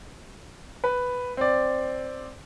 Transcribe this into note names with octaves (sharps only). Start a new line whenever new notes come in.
B4
C4 D5